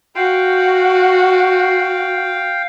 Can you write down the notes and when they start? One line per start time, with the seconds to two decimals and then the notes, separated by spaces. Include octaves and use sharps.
0.15 F#4 F5 G5